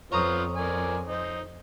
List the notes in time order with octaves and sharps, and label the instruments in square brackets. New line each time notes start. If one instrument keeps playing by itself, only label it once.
[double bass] F2 [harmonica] B3 C4 F4 [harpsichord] C#5 A#5 D#6
[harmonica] A#4 D5 G#5
C4 D#4